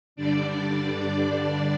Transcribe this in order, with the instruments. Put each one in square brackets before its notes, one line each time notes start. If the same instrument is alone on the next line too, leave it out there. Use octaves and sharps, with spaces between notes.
[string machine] G2 D3 G3 D4 D5